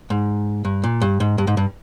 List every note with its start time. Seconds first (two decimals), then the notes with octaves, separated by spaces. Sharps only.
0.10 G#2
0.65 G2
0.84 A#2
1.02 G2
1.20 G#2
1.38 G2
1.47 G#2
1.57 G2